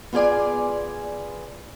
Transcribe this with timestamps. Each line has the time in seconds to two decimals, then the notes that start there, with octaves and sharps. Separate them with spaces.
0.13 B3 F4 G#4 D5 G#5